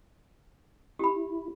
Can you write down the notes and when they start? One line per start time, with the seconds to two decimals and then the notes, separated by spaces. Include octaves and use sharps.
0.99 E4 G4 B5